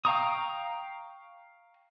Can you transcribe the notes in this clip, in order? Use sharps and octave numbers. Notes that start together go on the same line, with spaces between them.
F5 G5 A#5 C#6 D#6